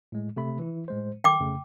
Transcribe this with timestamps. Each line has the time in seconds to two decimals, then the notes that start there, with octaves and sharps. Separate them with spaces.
0.12 A2 G#3
0.37 C3 A3 B5
0.59 E3 E4
0.88 A2 G#3 C5
1.24 D#3 A4 G5 C6 D6
1.40 F2 C#3 A3